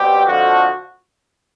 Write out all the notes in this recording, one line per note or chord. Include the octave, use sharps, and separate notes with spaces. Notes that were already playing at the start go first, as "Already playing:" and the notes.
Already playing: B2 G3 C4 G4
F2 D3 F3 F#4